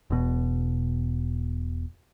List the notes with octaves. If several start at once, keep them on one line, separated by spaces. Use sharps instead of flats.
E1 B2